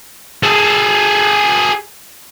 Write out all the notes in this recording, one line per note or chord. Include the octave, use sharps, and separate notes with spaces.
G#4 A4